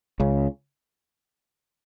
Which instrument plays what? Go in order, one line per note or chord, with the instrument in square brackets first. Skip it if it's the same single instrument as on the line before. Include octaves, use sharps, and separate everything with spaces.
[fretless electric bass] C#2 C#3